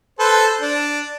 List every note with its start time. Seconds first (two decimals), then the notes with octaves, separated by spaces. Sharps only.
0.19 A4 B4 C5
0.61 D4